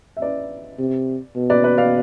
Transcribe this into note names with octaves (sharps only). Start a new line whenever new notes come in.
E5
B4 D5
C3
B2
B4 D5
B4 D5
D5 F5